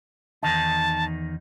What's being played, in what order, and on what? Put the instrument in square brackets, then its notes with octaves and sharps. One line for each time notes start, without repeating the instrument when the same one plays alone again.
[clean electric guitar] E2 D#3 D#4 [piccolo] A5